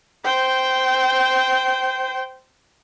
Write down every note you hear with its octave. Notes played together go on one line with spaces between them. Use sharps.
C5 G5